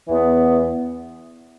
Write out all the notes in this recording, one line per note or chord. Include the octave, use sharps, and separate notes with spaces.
E2 E3 B3